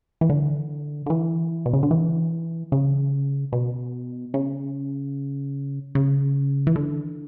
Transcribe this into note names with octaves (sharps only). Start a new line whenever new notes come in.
E3
D3
D3
E3
B2
C#3
D3
E3
C#3
B2
C#3
C#3
E3
D3